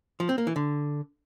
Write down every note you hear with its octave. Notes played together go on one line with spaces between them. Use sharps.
F3
C4
A#3
E3
D3